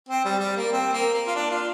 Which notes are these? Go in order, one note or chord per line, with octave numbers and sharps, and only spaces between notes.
C4
G3
G3
A#3
C4
A#3
A#3
F4
D4
F4